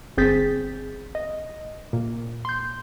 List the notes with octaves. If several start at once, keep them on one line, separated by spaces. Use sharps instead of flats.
G1 C4 G#4 G6 A6 B6
D#5
A#2
C6 G6